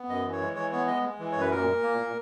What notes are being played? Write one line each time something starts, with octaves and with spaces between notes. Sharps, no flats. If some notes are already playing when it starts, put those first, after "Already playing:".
Already playing: B3
F#2 D#5
E3
C#5
G#3
E3 C#5
B3 C#5
G#3 D#5
G#3
E3
F#2 C#5
B4
A#2 A#4
A#2
A#3
A#2